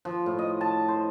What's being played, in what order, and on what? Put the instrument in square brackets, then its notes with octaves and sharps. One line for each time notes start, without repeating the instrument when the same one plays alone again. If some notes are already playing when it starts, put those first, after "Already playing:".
[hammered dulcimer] F3
A2
D#5
A5
C5